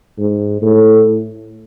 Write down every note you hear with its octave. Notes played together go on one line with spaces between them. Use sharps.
G#2
A2